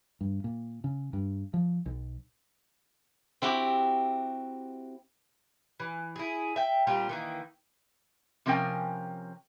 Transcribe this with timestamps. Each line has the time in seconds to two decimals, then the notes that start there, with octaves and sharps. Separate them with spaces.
0.21 G2
0.44 A#2
0.84 C#3
1.13 G2
1.54 F3
1.86 B1
3.42 C4 E4 F#4 G4
5.80 E3
6.16 E4 G#4
6.56 E5 G5
6.87 A#2 G3 C4 F4
7.09 D#3 E3 A#3
8.46 C3 F3 C#4 A#4 G5 G#5